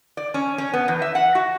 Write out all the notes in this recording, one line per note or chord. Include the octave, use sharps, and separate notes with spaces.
D5
C#4
C#4
B3
E2
E5
F#5
F#4